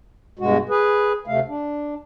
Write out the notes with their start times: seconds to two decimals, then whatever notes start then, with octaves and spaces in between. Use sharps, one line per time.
0.39 G2 B2 G#3 F#4
0.69 G#4 B4
1.27 D2 C3 A3 F5
1.48 D4